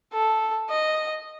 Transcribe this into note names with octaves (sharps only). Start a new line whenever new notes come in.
A4
D#5